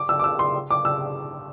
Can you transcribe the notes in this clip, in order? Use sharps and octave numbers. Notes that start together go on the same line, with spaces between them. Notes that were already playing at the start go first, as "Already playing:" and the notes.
Already playing: D6
E6
D6
E6
C6
D6
E6